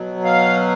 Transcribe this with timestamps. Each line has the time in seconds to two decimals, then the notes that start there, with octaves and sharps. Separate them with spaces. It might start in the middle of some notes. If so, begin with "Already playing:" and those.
Already playing: B2 F#3
0.24 F5